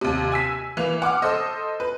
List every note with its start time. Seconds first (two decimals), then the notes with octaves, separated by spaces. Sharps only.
0.01 D#2 C3
0.32 G#5 E6 B6
0.77 E3 A#3 F7
1.02 F#5 D6 F6
1.22 A4 C5 D#5
1.80 B4